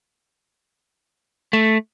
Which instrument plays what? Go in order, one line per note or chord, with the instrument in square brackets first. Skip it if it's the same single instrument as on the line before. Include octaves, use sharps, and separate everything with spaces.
[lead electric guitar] A3